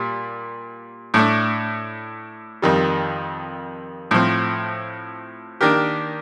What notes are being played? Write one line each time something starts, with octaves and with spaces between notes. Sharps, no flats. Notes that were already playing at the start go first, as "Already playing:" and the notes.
Already playing: A#2 G3
A2 A3 D4
F2 D#3 G3
A2 F3 C4
D#3 A#3 D4 G4 A#4